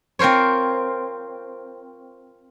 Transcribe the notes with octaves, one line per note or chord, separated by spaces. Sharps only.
C4 F4 A#4 C5 C#5